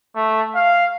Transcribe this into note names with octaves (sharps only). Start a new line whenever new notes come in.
A3
F5